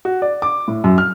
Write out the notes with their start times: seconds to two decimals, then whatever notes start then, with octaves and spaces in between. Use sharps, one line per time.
0.05 F#4
0.22 D5
0.42 D6
0.68 A2
0.84 F#2
0.98 F6